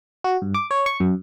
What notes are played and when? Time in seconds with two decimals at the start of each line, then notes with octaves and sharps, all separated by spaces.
0.24 F#4
0.42 G2
0.54 D6
0.71 C#5
0.86 C#6
1.00 F#2